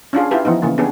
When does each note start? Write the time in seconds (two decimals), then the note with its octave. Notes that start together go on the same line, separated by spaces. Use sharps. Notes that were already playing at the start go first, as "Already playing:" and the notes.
0.13 C#4 D4 F4 G#4
0.31 E4 F4 G4 B4
0.45 E3 F3 B3 D#4
0.62 C#3 E3 A#3
0.78 B3 C#4 D4 G4 G#4